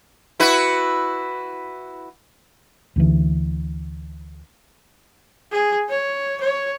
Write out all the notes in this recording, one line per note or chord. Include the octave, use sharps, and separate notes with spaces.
E4 F#4 B4
D2 D3 E3
G#4
C#5
C#5